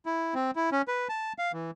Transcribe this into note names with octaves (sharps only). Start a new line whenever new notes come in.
E4
C4
E4
C#4
B4
A5
F5
E3